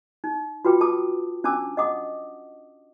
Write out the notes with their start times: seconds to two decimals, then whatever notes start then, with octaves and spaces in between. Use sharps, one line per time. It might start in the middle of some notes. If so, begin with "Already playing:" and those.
0.24 D#4
0.65 F4 F#4 B4 G5 D6
0.81 A4 A5 D6 D#6
1.44 C#4 D4 G5 A5 D6 E6
1.77 D#5 F#5 D6 D#6